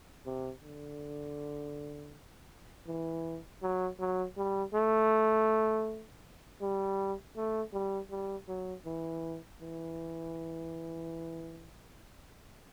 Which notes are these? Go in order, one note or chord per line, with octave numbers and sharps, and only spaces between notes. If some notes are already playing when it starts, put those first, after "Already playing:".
C3
D3
E3
F#3
F#3
G3
A3
G3
A3
G3
G3
F#3
E3
E3